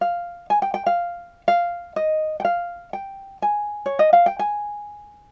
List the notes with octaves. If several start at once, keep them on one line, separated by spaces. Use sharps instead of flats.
F5
G#5
G5
G5
F5
F5
D#5
G5
F5
G5
G#5
C#5
D#5
F5
G5
G#5